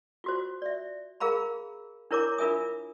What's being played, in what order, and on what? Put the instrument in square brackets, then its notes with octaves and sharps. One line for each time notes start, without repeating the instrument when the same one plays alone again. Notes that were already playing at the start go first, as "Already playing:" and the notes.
[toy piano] F4 F#4 C5
D5 E5
G#4 A#4 F5 A#5 B5
D4 E4 A#4 C#5 A#5 D6
D4 F4 A#4 E5 G#5 D#6